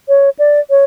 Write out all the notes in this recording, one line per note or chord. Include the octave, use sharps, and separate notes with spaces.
C#5
D5
C#5